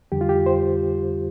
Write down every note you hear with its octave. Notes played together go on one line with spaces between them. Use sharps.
F2 D3 G3 G4
F4
G4
C5